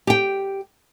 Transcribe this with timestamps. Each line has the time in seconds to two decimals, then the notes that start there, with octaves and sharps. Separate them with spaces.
0.07 G4 G5